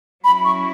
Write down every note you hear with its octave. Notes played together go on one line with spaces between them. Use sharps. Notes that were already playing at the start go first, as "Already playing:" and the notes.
F#3 C#4 E4 B5
C#6